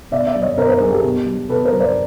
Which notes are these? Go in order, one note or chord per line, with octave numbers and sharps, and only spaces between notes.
B2 D5 E5
D5 E5
F#3
C#5 D#5
B2 A#4 C5
A#4 C5
F#3 G#4 A#4
G4 A4
B2
F#3
B2 A4 B4
A#4 C5
F#3
C5 D5